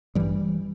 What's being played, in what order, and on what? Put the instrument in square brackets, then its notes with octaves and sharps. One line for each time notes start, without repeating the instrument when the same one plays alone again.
[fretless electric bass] A1 G2 E3 G3